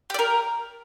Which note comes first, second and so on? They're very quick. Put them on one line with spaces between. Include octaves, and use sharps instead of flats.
G4 D5 A#4